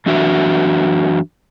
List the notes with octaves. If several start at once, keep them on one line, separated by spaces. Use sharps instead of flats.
F#2 E3 D4 F#4 E5